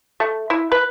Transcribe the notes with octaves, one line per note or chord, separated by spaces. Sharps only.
A3
E4
B4